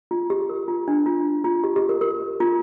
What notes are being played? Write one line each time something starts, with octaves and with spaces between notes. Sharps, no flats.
F4
G4
A#4
F4
D4
F4
F4
G4
G4
A#4
A#4
F4